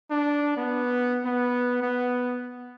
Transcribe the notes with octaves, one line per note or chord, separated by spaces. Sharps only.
D4
B3
B3
B3